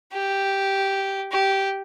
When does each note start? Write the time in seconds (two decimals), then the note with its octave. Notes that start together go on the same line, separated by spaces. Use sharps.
0.14 G4
1.32 G4